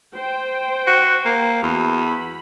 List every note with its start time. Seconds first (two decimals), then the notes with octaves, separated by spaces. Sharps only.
0.15 C5 G5
0.87 F#4
1.25 A#3
1.63 E2 F#4
1.99 B5